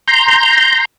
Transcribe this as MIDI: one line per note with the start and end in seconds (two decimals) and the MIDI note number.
0.08 0.85 82
0.08 0.85 84
0.08 0.85 91